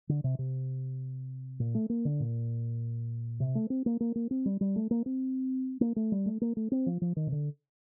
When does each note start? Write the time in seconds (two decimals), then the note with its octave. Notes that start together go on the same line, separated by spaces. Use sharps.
0.09 D3
0.24 C3
0.39 C3
1.60 A#2
1.75 A3
1.90 A#3
2.05 D3
2.20 A#2
3.40 C3
3.55 A3
3.70 C4
3.86 A#3
4.00 A#3
4.16 A#3
4.31 C4
4.46 G3
4.61 G3
4.76 A3
4.91 A#3
5.06 C4
5.81 A#3
5.96 A3
6.12 G3
6.26 A3
6.41 A#3
6.57 A3
6.72 C4
6.86 F3
7.02 F3
7.16 D#3
7.27 C3
7.32 D3